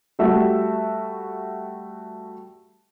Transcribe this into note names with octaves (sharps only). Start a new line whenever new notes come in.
G3 A3 F#4 E5